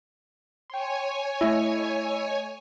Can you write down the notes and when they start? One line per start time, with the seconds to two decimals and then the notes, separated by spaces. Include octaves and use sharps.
0.70 C#5 G5 G#5 C6
1.41 A3 E4 D#5